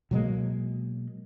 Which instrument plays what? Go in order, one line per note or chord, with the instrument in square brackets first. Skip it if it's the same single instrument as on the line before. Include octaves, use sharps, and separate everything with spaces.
[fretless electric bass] B2 F#3 G#3 A#3